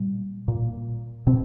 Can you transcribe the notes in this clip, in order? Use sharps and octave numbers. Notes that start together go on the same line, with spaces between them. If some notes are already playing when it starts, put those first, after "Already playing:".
Already playing: A#2 G3
A#2
B2 C4